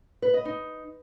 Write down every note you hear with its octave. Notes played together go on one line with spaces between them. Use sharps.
B4
D#5
D#4